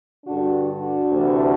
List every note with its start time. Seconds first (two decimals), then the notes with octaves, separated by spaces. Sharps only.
0.24 G2 D3 D4 F#4
0.66 D4 F#4
1.07 D2 C3 E3